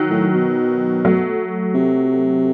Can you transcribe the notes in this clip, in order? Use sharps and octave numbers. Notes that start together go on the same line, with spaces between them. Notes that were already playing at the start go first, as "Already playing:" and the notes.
Already playing: D#3 F#3
A2
B2
F#3 A3
C3